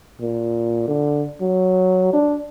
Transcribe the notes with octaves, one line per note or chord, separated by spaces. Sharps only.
A#2
D3
F#3
D4